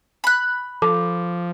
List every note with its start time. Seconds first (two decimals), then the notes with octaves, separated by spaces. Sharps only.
0.24 B5 F#6
0.82 F3 A4 D6